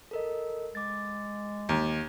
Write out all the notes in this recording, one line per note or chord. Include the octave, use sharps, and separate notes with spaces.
A4 A#4 D#5
G#3 D6 A6
D#2